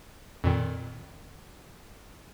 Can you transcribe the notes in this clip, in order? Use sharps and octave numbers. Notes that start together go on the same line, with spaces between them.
F2 A#2 D#3